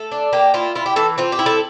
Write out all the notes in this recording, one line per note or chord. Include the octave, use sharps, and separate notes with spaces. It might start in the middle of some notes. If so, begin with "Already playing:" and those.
Already playing: A3 A4
D4
A#3 G4
E4 F4
E4 F4
G4
E3 A4
C4 F4
G4
E4
A4